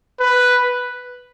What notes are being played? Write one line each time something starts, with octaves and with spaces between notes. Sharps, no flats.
B4